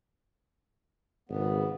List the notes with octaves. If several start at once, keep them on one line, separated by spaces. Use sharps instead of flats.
G#1 C#3 B3